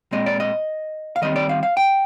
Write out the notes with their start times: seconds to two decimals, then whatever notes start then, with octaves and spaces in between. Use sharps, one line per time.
0.12 A#2 G#3 C4 D#5
0.26 D5
0.40 D#5
1.16 F5
1.22 D#3 G3 C4 D#5
1.36 D5
1.49 F5
1.63 F5
1.77 G5